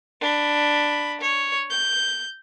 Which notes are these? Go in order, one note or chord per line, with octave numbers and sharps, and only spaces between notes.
D4 B5
C#5
G6